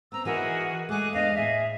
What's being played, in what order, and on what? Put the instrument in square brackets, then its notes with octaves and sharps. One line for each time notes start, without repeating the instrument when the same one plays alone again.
[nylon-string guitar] B3 C4 [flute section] A#5 E6
[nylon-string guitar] E3 D#4 B4 [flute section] F#4 G#4 A#4
[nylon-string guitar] G#3 A3 [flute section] G#4 D6 F#6
[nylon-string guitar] E2 D4 [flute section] D#5 F5
[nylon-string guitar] A2 [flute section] G#4 E5